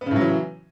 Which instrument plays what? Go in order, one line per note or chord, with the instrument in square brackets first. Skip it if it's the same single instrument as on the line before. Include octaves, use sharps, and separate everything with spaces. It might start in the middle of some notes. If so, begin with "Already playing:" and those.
[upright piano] B3
C#3
A2
F#3
E3